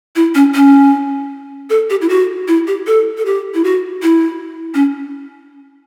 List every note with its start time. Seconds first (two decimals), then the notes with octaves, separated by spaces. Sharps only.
0.16 E4
0.35 C#4
0.55 C#4
1.70 A4
1.90 G4
2.01 E4
2.09 F#4
2.48 E4
2.67 G4
2.87 A4
3.18 A4
3.25 G4
3.54 E4
3.64 F#4
4.03 E4
4.74 C#4